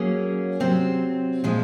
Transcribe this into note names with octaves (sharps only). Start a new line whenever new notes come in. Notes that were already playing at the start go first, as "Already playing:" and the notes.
Already playing: F#3 A#3 C#4 G#4
C3 F#3 C4
A#2 F3 G#3